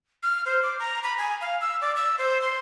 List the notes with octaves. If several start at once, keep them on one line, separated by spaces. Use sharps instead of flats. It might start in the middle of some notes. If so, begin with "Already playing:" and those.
F6
C5
D6
A#5
B5
G#5
F5
E6
D5
E6
C5
C6